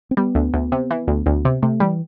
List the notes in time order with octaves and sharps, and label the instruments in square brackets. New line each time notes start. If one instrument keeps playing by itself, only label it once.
[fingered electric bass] C4
[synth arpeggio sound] G3 [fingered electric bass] B3
[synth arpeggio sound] D2
D2
C3
E3
D2
D2
C3
[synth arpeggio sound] C3 [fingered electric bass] A3
[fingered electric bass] E3 [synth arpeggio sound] G3